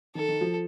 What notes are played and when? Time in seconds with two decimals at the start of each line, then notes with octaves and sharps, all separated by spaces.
0.15 D#3 A4
0.28 D#3
0.41 F3